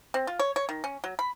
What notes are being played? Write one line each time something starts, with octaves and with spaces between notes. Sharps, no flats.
C4
F4
C#5
C#5
D#3
C#4
F#3
B5